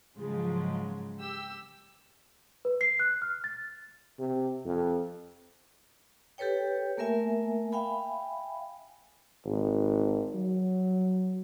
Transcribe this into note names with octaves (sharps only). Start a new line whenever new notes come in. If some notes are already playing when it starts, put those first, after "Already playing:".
G#2 C#3 F3 F#3 G#3
G4 E6
B4
C7
F#6
F6
A6
C3
F2
G4 A4 B4 C#5 G5
A3 A#3 A#4 E5 G#5
E5 F5 G5 G#5 B5
G#1
F#3